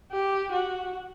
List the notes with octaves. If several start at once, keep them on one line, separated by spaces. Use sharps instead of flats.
G4
F#4